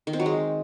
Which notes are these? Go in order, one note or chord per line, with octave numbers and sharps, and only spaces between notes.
D#3
C4
F#3
G#3